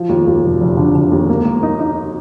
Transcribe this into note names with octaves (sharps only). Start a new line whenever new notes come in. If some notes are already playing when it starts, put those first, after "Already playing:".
Already playing: F3
D#2
D#2
F1
F1
D3
D3
D#2
A#3
A#3
D#4
D#4